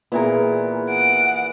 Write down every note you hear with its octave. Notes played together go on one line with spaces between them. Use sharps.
A#2 E3 B3 G#4 A#4
F#5 D7